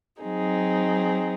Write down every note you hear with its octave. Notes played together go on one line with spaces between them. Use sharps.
F#3 C4 D#4 G#4